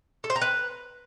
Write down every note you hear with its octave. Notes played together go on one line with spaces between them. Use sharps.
A4
C5
A#5
B4